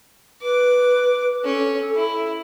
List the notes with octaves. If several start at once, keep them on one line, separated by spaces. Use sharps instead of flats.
B4 D6
C#4 A4
E4